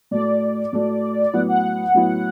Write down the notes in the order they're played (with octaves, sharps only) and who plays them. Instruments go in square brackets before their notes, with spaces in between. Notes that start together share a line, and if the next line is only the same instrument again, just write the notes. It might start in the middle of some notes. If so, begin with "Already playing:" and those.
[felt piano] A2 A3 F#4 [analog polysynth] D5
[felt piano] A2 A3 F#4
[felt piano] A2 F#3 B3 E4 [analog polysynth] F#5
[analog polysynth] F#5
[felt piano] A2 F#3 B3 E4